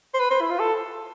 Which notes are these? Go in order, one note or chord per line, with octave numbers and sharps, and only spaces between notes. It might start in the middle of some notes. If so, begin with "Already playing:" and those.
C5
B4
C5
E4
F4
A4